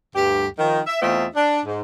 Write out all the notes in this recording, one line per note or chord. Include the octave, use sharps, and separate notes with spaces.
D2 G2 G4
D#3 F3
E5
E2 A3 C4 F4 D#5 E5
D4
G#2